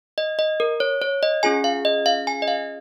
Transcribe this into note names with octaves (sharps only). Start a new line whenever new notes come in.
D#5
D#5
A#4
C#5
C#5
D#5
C#4 F4 G#4 G#5
F5
D#5
F5
G#5
D#5
F5